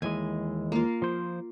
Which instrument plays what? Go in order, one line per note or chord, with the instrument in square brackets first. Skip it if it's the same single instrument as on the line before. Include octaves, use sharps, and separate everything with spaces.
[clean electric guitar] D#2 E3 G#3 [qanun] G#5
[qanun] A#3 F4
[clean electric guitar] F3 C5